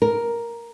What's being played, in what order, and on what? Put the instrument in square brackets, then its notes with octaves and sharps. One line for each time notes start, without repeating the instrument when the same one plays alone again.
[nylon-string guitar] A#4